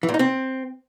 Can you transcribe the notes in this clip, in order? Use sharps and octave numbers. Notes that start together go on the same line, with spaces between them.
E3
A#2
D#4
C4